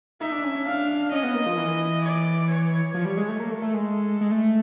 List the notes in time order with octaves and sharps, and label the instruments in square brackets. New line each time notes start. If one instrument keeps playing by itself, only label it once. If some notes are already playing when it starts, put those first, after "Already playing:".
[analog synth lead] D#4 [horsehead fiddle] E5
[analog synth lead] D4
C#4
C#4
[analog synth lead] D4 [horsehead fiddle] F5
[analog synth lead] C#4 [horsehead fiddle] D#5
[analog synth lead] B3
A#3
F3
E3
[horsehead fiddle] D5
C#5
[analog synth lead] F3
G3
G#3
A3
[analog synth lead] A#3 [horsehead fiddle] A4
[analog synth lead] A3
A3
G#3
G#3
A3